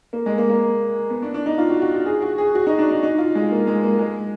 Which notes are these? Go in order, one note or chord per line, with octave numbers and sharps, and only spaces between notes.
A#3
G#3
A#3
A#3
B3
D4
D4
D#4
F4
F#4
F#4
F#4
G#4
F#4
G#4
F#4
D#4
D4
D#4
D#4
F4
G#3
A#3
G#3
A#3
G#3